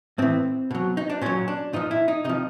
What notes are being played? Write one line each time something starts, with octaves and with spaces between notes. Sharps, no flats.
A2 E3 C4
B2 F#3
D#4
D4
A#2 F#3 C#4
D4
A#2 F3 D#4
E4
D#4
C3 F3 D#4